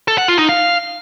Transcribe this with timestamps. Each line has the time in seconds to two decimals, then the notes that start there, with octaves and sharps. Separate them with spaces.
0.08 A4
0.18 F#5
0.28 F4
0.39 D#4
0.49 F5